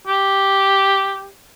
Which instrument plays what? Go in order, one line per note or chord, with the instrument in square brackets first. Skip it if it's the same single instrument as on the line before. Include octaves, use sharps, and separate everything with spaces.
[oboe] G4